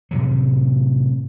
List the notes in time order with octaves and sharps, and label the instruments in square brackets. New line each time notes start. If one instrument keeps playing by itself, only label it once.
[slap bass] A2 C3 D#3 F#3